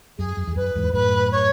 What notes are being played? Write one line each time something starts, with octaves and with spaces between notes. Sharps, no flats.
F#2 G#4
F#2
E2
F#2 B4
E2 G#2
F#2 A2 B4
C#5